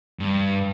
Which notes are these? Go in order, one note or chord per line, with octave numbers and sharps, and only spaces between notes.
G2